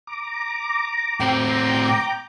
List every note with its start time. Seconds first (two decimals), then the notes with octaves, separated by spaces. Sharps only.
0.07 A#5 D6
1.20 A2 C4 G5